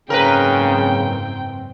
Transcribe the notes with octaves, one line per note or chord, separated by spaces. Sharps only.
F#1 G#2 C#3 C4 A#4 B4 G5